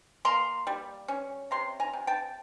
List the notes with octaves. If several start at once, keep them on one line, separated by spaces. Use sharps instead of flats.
A#3 A#5 C6
G3
C#4
C3 A#5 C6
G#5 A#5
C3
G5 A5